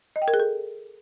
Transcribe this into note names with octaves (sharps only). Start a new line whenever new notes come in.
D#5
G5
A#4
G#4
A4